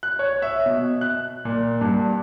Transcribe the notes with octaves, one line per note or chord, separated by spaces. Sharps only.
F#6
C#5
E5
B2
F#6
A#2
G2